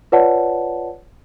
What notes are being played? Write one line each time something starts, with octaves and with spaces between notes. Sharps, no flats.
F4 B4 C#5 D5 F#5 A5